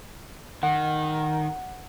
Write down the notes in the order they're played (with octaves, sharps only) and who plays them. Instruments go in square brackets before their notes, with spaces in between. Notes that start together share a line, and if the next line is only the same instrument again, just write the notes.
[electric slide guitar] D#3 [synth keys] F#5